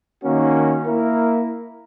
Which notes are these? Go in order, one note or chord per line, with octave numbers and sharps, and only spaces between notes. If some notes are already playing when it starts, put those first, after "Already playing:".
D#3 A#3 C#4 F#4
A#3 E4 A#4